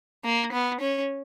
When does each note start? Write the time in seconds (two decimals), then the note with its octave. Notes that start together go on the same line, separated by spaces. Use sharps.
0.24 A#3
0.52 B3
0.80 C#4